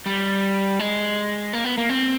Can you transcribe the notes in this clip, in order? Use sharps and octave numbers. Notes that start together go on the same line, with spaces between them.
G3
G#3
A#3
B3
A#3
C4